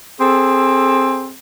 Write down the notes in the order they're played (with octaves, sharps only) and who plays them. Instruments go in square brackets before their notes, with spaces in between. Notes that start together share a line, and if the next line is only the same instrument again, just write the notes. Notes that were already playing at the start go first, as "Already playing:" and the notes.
[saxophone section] C4 G#4 A4